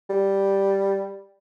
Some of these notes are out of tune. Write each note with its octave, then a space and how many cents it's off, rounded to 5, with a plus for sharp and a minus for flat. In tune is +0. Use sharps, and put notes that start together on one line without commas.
G3 +0